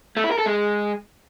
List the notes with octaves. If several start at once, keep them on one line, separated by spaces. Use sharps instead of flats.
A3
E4
A#4
A4
G#3